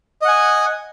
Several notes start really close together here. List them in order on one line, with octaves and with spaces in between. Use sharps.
D#5 F#5 G#5